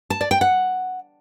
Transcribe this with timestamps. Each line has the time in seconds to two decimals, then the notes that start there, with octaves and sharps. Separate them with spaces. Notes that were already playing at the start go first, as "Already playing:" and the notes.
0.10 A5
0.21 D5
0.31 G5
0.41 F#5